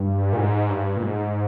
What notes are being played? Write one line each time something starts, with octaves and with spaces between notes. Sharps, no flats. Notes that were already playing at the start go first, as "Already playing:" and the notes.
Already playing: G2
A#2
G#2
G2
A#2
G#2